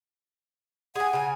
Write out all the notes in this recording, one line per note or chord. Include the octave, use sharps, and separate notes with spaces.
G#4 F#5 G#5
C#3 G#5